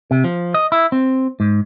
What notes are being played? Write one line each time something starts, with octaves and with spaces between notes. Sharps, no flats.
C3
F3
D#5
E4
C4
G#2